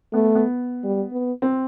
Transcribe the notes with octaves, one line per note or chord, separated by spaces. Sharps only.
A3 B3
B3
G3
B3
C4